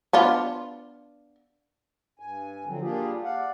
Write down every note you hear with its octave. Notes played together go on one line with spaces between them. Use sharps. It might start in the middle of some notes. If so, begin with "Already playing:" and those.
B3 D4 F4
G2 G#5
D3 F3 F#3 C4
G3 A#3 D4 F4 G4 G#4
D5 F5 F#5